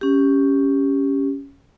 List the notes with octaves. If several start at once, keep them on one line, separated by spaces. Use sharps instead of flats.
C#4 G4